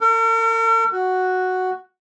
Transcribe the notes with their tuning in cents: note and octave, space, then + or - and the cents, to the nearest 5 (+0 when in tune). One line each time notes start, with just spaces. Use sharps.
A#4 -45
F#4 +0